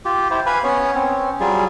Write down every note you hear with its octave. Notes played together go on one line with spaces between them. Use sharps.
F4 G4
E4 G4 C5
B4 F5 G#5 B5
B3 C#4 C#5
C4 C#4
F#3 G3 F4 G#4